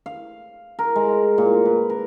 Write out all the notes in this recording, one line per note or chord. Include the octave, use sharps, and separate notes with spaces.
F5
A#4
G#3
A#2
B4
A#4